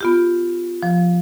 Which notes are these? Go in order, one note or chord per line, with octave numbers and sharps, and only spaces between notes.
B3 F4 G4
F3